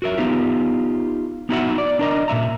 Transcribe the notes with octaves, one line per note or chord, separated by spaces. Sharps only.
F#4 A#4 E5
B3 D#4 F4 G4
B3 D#4 E4 F#4 E5 F#5
D5
D4 A#4 D#5
A#2 B3 E5 A#5